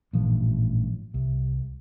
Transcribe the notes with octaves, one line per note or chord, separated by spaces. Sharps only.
A1 G2 A#2 F3
C2